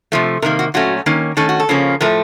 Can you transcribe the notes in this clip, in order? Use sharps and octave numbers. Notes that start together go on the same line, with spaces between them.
C3 F3 A3
C3 D#3 A#3 A#4
F#4
A#2 F#3 A3 C#4 F#4
D#3 A#3 C#4
D#3 A3 C#4 A4
F#4
A4
C#3 F3 A#3 C#4
A2 F3 A3 A#4